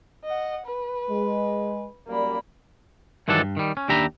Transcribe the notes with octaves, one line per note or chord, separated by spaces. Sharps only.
D#5 F#5
B4
G#3
F#2 G3 A#3 D5 B5
G2 D#3 E3 F#3 D4 A4
G2
D#3 G3
C#4
D#2 D4 G4 E5 A#5 B5